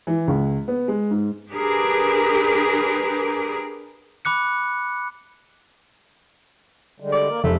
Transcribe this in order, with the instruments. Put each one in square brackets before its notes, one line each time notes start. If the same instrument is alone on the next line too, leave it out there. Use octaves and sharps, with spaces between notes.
[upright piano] E3
C#2
B3
G#3
G#2
[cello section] D4 G4 G#4 A#4 B4
[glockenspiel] B5 D6 F#6 C#7
[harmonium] D3 G3 G#3
[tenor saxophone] D5
[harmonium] A#3 A#4
[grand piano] F1 [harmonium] C#3 G#3 [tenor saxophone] A3